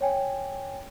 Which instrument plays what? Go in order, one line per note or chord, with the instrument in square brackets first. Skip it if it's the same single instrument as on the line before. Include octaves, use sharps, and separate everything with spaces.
[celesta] C#5 G5 G#5